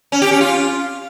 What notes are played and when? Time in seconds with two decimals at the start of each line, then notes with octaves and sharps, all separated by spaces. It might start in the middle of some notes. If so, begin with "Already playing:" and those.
0.12 C#4
0.22 G4
0.31 C#4
0.41 F4